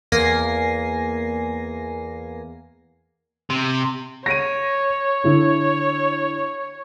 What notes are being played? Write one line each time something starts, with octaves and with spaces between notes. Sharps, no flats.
E2 A#3 G#5 A#6 C7
C3
C#5 A#6 D7 D#7
D3 E4